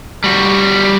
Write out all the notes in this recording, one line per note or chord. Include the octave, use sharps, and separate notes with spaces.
G3 F#4